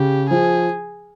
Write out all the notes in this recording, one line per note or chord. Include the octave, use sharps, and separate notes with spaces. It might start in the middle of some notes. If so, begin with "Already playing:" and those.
Already playing: C#3 G4
F3 G#4